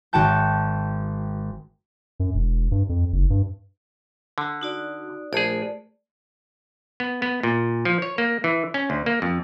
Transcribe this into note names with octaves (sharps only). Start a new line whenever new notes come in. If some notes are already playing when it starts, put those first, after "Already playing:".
G#1 F#4 G5 A5 G6
F#2
E1
G2
F2
F#1
G2
D3
D#4 F#4 D5
A#1 A3 G#4 D5
B3
B3
A#2
F3
C#5
A#3
E3
C#4
D2
A#3
F2